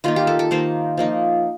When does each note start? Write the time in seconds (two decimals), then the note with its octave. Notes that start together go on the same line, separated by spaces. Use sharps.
0.04 D#3 A#3 D#4 F4
0.16 G4
0.27 A4
0.39 A4
0.51 D#3 A#3 D#4 C5
0.97 F3 A#3 D#4